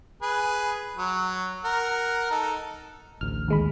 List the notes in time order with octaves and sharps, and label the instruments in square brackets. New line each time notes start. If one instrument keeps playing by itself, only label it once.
[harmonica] G#4 B4
F#3
A#4 F#5
D#4 A4
[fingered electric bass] A1 D2 [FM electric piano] F6
[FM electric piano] D#2 G#3 B5